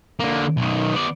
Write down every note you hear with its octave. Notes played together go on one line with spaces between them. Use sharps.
D3 A#3
B1 D#3
B3 D5